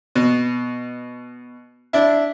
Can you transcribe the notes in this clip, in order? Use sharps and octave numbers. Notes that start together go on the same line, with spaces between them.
B2
D4 E4